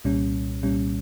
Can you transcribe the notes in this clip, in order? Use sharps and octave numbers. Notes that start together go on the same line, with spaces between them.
C2 A#2 G3 C#4
C2 A#2 G3 C#4